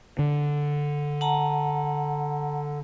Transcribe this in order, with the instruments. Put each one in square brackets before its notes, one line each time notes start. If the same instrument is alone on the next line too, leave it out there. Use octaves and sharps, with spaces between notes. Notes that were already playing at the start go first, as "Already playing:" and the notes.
[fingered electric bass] D3
[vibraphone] F#5 A5 A#5